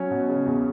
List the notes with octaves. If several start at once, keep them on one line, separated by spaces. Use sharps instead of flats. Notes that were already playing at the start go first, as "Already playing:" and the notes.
Already playing: F#3 C#4 C#5
B2
C#3
E2